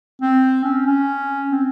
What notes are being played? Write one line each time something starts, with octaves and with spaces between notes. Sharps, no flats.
C4
C#4
C#4
C4